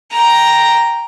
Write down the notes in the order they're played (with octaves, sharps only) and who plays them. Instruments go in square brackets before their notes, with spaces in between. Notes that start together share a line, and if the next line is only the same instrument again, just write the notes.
[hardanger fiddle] G5 A#5